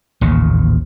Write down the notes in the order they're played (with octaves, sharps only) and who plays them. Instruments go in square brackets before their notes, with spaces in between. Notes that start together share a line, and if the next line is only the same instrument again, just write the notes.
[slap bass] A1 D#2 A#2 C#3